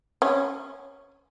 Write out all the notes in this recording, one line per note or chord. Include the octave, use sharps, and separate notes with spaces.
C#4